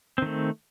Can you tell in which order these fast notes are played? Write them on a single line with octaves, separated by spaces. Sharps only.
C4 D#3 A3